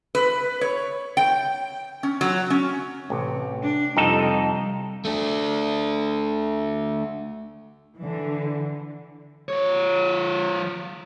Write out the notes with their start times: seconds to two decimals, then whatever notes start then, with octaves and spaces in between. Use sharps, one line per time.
0.15 B4
0.61 C#5
1.17 G5
2.03 C#4
2.21 F#3
2.50 C#4
3.10 A1 C3
3.63 D4
3.97 F2 C3 G3 D#4 A4
5.05 A3 D4
7.98 D3 E3
9.48 F3 C#5